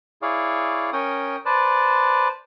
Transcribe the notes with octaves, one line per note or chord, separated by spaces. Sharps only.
E4 G#4 C#5 D5 F5
C#4 A#4 C#5 G5 D#6
B4 C5 D5 A5